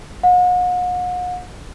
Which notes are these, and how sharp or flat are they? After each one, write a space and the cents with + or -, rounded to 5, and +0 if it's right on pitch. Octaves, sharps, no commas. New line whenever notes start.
F#5 -45